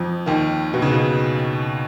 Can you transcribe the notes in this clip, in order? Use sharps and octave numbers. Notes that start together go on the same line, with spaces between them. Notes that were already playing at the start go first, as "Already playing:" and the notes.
Already playing: F2 F3
D#2 D#3
B2
C#3
B2